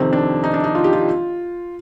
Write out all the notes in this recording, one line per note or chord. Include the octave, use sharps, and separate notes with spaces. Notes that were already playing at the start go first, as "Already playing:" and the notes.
Already playing: F2 C3 D#3 C4
D4
D#4
D4
D#4
F4
G4
F4